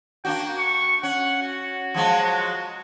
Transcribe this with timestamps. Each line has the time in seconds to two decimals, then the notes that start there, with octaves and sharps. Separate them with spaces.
0.25 A#3 D4 F#4 G5
0.59 C#6
1.03 C#4 F#5
1.43 F#4
1.94 F3 F#3 G#3